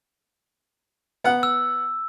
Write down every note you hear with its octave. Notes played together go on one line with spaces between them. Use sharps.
B3 F#5
E6